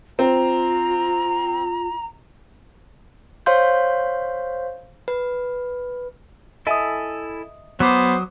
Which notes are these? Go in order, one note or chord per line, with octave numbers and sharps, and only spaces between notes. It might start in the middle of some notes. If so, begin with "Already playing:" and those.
C4 F4 A#5
C5 C#5 F5 C6 G6
B4
E4 A4 D#5 E5 G#5 D#6
F#3 B3 C5 A#5 D6 D#6